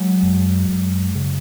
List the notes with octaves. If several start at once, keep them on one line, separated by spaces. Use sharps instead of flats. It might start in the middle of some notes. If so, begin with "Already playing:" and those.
Already playing: F#3 G#3
F#2
F#2
C#3